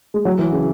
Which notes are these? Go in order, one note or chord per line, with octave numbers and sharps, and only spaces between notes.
G#3
F#3
E3
C#3